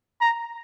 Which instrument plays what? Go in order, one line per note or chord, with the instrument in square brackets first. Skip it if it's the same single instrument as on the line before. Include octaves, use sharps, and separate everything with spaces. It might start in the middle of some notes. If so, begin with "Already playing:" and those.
[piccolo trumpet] A#5